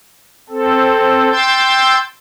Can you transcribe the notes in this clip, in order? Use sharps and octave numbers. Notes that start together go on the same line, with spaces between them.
C4 A4
G5 C6 E6 G6 A6